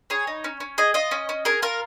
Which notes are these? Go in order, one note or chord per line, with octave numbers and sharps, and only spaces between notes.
G#4 C#5
D#4
C#4
C#4
G#4 D#5
F4 D#5
C#4
C#4
G#4 A#4
F4 A#4